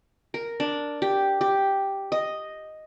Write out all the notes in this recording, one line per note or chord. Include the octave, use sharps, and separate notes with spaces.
A#4
D4
G4
G4
D#5